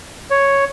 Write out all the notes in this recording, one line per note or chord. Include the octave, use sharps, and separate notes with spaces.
C#5